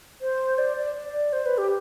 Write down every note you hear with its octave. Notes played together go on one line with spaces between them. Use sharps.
C5
D5
D5
D5
C5
B4
G4